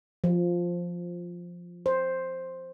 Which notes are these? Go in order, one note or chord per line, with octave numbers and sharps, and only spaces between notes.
F3
C5